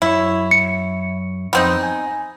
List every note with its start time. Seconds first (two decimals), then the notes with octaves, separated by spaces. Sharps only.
0.02 F#2 E4 C#5
0.51 C#7
1.53 F2 B3 C4 D#4
1.83 G#5